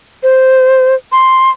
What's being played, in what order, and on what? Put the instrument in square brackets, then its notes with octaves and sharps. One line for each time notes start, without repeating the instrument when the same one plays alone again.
[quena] C5
C6